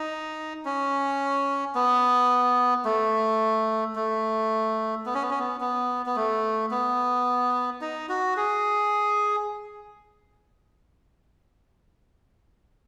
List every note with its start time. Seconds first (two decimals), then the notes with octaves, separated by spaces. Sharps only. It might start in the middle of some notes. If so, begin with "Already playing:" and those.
Already playing: D#4
0.65 C#4
1.75 B3
2.85 A3
3.95 A3
5.06 B3
5.15 C#4
5.22 B3
5.31 C#4
5.39 B3
5.61 B3
6.06 B3
6.16 A3
6.71 B3
7.81 D#4
8.09 F#4
8.37 G#4